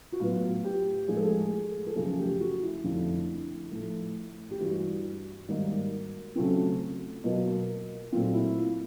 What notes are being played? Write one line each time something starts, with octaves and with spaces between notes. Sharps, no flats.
F#4
A2 F#3 B3 F4
G4
A2 F3 G#3 G#4
A4
G#4
A4
F#2 C#3 F3 A3 G#4
G4
F#4
E4
F2 D3 F3 A3 C4
A2 F3 A3
G4
G2 E3 G3 F#4
G#2 D#3 G3 A#3
C#3 F#3 A3 C4
B2 F#3 A#3
A#2 F#3 A3 C4 F4
E4
F4